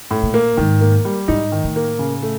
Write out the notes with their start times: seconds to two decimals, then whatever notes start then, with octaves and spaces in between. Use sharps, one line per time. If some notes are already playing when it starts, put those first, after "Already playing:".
0.11 A2
0.23 A#2
0.34 A#3
0.57 G#2 D#3
0.81 A#3
1.05 G3
1.28 G#2 D#4
1.52 D#3
1.64 A2
1.76 A#3
1.99 C#3
2.22 A3